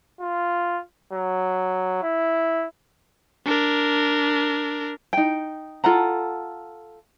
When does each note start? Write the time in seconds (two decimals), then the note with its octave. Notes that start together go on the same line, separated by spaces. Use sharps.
0.21 F4
1.13 F#3
2.03 E4
3.45 D4 A#4
5.13 D#4 G5
5.84 F4 A4 F#5 A#5